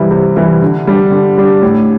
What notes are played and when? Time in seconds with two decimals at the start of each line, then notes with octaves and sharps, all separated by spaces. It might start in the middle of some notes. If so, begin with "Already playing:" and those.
Already playing: C3 E3 G3 E4
0.11 C3
0.36 E3 G3 E4
0.62 D3
0.87 G3 D4
1.12 D3
1.37 G3 D4
1.62 A2